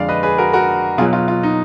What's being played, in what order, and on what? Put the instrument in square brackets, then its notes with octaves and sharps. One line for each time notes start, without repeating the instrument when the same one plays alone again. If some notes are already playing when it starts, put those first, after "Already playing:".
Already playing: [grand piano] F2 D3 G#3 D5 F5
B4 D#5
G#4 B4
F#4 A#4
F#4 A#4
B2 F#3 F4 G#4
F4
F4
D#4